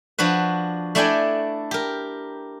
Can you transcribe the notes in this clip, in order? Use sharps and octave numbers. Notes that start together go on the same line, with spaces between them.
F3 D4 F#4 B4
A3 D4 E4 D5 G5 G#5
G4 A#4